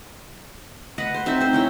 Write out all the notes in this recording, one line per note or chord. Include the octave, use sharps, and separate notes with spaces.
B4 D#5 F#5
C5
C4 D#4 C5 E5
D#4 C5
C#4 E4 G5